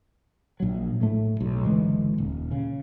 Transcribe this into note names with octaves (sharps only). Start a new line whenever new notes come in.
A#1 F#3
A2 A3
B1
F#1 D3 E3 G#3
D#1
C#3